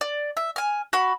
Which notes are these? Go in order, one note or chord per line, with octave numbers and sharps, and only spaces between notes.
D5
E5
G#5 F6
F#4 B5